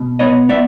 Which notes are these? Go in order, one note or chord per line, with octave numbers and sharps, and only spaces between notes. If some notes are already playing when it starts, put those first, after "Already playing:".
Already playing: B2
B3 C#5 D#5
B3 D5 E5